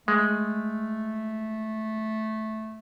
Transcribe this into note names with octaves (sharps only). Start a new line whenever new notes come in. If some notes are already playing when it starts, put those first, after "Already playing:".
G#3 A3